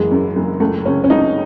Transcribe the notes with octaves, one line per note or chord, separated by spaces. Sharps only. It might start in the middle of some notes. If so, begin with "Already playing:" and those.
Already playing: F#1 E3 G#3
F#2
F#1
C#2 A3
C#3 C#4
C#4
C#2 D#4